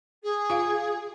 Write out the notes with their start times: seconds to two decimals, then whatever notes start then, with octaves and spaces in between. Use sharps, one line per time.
0.23 G#4
0.50 F4 F5